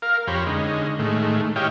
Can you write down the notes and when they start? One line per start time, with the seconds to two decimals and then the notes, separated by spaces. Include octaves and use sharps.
0.02 A#4 F5
0.27 F2 G4 C5 C#5 A#5 B5
0.47 D3 G#3 C#4 D#4
0.99 A2 D#3 G#3 A3
1.56 E4 G4 C#5 D#5 F5 G5